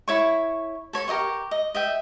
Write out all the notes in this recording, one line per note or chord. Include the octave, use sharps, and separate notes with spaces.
E4 C#5 C#6
A4 C#5 C6 C#6
G4 A#4 D#5 C#6
D#5
D#5 E5 G5